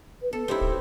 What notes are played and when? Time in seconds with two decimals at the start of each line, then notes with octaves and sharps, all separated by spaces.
0.21 B4
0.33 B3 A4
0.48 C4 D#4 E4 G4
0.62 D1